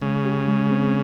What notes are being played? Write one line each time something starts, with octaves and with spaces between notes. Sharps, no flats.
C#3 G#3
G4
G#3
C4